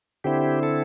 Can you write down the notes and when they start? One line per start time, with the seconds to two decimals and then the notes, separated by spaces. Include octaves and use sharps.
0.24 D3 C4 E4 G4
0.63 A4